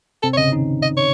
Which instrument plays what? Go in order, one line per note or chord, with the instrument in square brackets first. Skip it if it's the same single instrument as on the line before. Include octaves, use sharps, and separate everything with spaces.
[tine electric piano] C3 C4 [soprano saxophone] A4
[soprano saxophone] C#5
[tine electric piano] C#3 C#4 [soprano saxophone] D#5
[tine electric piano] D#3 D#4
[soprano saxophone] D#5
C#5